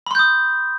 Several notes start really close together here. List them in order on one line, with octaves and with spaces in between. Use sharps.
B5 C6 G6 D#6